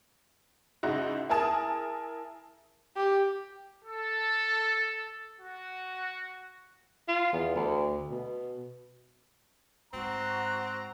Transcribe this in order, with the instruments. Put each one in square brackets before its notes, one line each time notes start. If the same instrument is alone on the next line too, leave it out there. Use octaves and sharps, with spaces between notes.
[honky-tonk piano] C#2 G#2 D#4 E4 F#4
E4 G#4 A#4 G#5 A5 D#6
[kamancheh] G4
[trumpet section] A4
F#4
[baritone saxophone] F4
E2
D2
B2
[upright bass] G#2 [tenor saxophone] C4 [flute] F#4 [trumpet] A#5